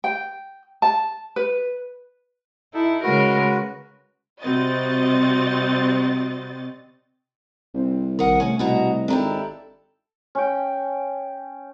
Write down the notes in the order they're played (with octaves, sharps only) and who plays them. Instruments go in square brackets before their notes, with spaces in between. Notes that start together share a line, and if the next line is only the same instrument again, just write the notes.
[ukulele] G5
A5
B4
[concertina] D#4 A4 [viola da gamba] E4
[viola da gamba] C#3 G#3 A#4 [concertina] F#4 B4
[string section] C3 G3 C4 F#4 D#5 A6
[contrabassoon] C2 [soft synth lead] C4
[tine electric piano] A#1 D#3 [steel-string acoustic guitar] A#4 F#5 [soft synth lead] D#6
[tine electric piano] C3 A3 [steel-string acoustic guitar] C#4
[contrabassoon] C2 [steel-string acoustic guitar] B2 F#4 A#5 [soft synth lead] D#5
[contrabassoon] G#1 [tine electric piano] C4 D#5 A#5 [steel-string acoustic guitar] D4 E4 G4 [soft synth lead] A4
[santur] C#4 G5